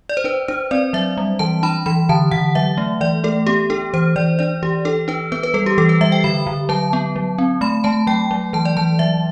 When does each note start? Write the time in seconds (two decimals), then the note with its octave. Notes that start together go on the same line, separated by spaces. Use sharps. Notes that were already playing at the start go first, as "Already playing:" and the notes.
0.09 D5
0.17 C5
0.24 D4 B4
0.48 D4 C5
0.71 C4 D5
0.93 F#3 E5
1.18 G3
1.39 E3 A5
1.63 D4 B5
1.86 E3 B5
2.09 D3 A5
2.31 D3 F#5
2.55 F#3 E5
2.78 A3
3.01 E3 D5
3.24 A3 A4
3.47 B3 G4
3.70 D4 A4
3.94 E3 C5
4.16 E3 D5
4.39 D4 D5
4.63 E3 G4
4.85 D4 A4
5.08 D4 B4
5.32 B3 B4
5.43 B4
5.54 G3 A4
5.66 G4
5.78 E3 A4
5.89 B4
6.01 G3 E5
6.12 G5
6.24 D3 B5
6.47 D3
6.69 F#3 A5
6.93 B3
7.16 F#3
7.38 C4
7.61 A3 B5
7.84 A3 A5
8.07 F#3 G5
8.31 F#3
8.53 E3 A5
8.65 D5
8.77 E3 A5
8.99 F#3 E5